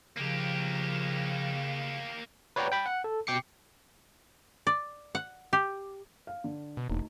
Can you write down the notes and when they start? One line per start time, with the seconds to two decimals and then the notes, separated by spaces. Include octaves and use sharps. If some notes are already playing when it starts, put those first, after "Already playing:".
0.18 C#3 F3 A#3 G4
2.56 B4 C#5 D5 F#5 G5 A#5
2.72 G5 B5
2.86 F#5
3.04 A4
3.27 B2 G5 D6 C7 C#7
4.67 D5
5.15 F#5
5.53 G4
6.27 F5
6.44 D3
6.77 B2
6.90 E1 D2 D#4